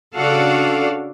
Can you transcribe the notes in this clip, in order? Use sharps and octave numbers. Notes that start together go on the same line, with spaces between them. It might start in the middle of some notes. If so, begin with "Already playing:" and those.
C#3 D4 F#4 A4 D5 F5